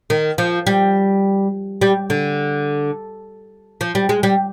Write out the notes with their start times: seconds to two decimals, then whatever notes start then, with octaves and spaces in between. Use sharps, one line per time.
0.10 D#3
0.38 F3
0.67 G3
1.81 G3
2.10 D3
3.81 F3
3.95 G3
4.09 G#3
4.23 G3